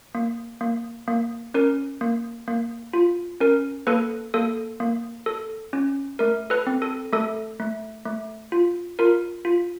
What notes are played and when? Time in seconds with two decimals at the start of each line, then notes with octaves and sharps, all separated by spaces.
0.15 A#3
0.61 A#3
1.08 A#3
1.54 C#4 A#4
2.01 A#3
2.48 A#3
2.93 F4
3.40 C#4 A#4
3.87 A#3 A4 B4
4.34 A#3 A4
4.80 A#3
5.26 A4
5.73 C#4
6.19 A3 A#4
6.50 A4 B4
6.67 C4
6.82 A4
7.13 A3 A4
7.60 A3
8.05 A3
8.52 F4
8.99 F4 A#4
9.45 F4